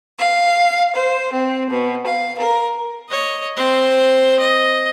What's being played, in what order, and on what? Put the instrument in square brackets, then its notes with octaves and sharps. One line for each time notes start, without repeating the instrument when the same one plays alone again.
[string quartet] F5
C5
C4
B2
F5
A#4
[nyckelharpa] C#5 D#5
C4 C5
D#5